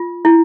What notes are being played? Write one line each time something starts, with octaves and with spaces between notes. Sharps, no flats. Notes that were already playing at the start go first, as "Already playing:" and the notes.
Already playing: F4
E4